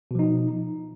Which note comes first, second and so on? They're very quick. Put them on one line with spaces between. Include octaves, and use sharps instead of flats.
B2 F3 D#4